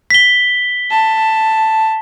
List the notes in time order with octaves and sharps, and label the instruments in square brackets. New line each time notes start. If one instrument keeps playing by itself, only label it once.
[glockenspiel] B6 G7
[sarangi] A5